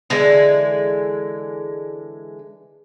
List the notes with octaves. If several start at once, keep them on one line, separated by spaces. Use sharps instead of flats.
D3 E3 G#3